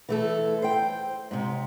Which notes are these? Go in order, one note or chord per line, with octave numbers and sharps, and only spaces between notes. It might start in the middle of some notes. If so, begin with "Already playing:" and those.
E3 A3 A4
C5 G5
G#2 C3